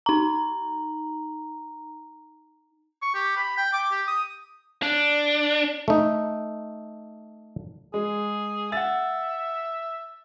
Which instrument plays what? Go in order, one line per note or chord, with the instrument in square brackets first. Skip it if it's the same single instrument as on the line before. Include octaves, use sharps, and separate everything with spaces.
[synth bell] D#4 A#5
[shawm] C#6
G4
B5
G5
D6
G4
D#6
[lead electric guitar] D4
[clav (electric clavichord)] A3 D#4
[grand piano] G#3 [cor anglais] G#4
[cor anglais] E5 [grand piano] F#5 A6